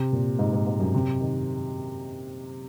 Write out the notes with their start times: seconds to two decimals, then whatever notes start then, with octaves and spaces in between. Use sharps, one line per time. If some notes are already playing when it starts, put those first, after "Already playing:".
Already playing: C3
0.12 A#2
0.39 G#2
0.53 G#2
0.67 G#2
0.79 F#2
0.94 C3
1.21 D#3